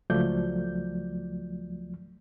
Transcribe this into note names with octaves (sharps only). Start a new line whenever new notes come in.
C#2 F3 F#3 A3 D5 G6